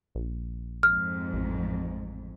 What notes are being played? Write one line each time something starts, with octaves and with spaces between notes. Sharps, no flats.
A#1
F2 G#2 F6
A1